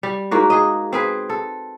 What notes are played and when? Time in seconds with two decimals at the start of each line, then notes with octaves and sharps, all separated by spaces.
0.03 G3
0.31 G#2 A#3 F#4
0.50 G#4 D#5
0.93 C4 G#4 B4
1.30 A4